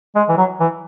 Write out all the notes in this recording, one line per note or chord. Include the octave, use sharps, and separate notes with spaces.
G#3
E3
F#3
E3